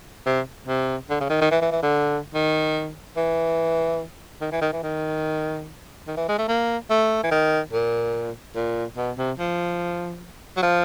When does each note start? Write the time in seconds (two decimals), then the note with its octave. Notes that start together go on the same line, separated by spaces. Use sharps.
0.26 C3
0.67 C3
1.10 D3
1.20 C#3
1.29 D#3
1.41 D#3
1.51 E3
1.61 E3
1.72 E3
1.83 D3
2.34 D#3
3.17 E3
4.41 D#3
4.52 E3
4.61 D#3
4.73 E3
4.83 D#3
6.08 D#3
6.17 E3
6.28 G#3
6.38 A3
6.48 A#3
6.90 A3
7.24 E3
7.31 D#3
7.73 A#2
8.55 A#2
8.97 B2
9.18 C3
9.39 F3
10.57 F#3
10.63 F3